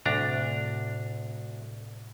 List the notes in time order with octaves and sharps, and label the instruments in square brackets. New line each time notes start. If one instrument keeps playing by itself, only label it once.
[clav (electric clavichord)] D2 D4 A#5 [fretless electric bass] A2 C3 G3